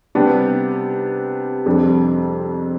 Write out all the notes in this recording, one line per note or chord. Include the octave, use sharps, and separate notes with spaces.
C3 G3 B3 D4 G4
F2 C3 G3 D4